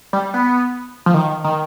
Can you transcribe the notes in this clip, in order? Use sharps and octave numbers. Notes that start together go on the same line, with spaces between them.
G3
B3
F3
D#3
D#3